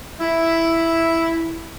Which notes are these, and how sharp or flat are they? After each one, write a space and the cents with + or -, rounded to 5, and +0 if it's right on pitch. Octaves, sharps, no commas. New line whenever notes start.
E4 +0